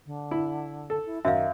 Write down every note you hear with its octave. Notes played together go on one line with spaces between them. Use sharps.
D3
E4
A4
E4
F#2 D#3 E5 F5